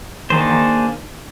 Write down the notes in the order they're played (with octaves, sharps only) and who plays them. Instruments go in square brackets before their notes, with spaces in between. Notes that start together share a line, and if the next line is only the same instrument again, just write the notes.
[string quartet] D#3 [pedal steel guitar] A#3 D4 G#4 C5